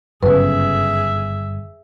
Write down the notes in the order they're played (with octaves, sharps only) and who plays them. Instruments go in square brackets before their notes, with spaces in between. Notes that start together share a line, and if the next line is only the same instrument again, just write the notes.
[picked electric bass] G1 [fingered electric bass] F#2 C#3 [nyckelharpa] G#4 E5 [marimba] B4